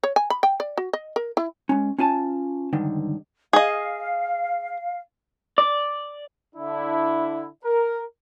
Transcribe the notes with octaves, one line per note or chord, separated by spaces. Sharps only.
C#5
G#5
B5
G5
D5
F#4
D#5
A#4
E4
G#3 C#4
C#4 F4 G#5 A5
C#2 G2 D3 D#3
G#4 D#5 F5
D5
D3 D4 E4
A#4